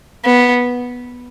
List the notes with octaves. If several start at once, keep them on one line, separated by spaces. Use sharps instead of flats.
B3